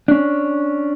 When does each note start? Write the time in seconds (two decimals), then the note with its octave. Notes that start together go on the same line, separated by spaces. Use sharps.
0.08 C#4 D4